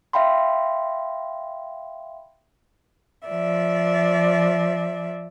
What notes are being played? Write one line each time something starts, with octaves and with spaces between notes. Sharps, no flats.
E5 F5 G5 B5 C6
F3 D5 E5